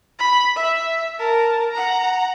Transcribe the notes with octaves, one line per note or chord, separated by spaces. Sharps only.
B5
E5
A#4 A5
F#5 A#5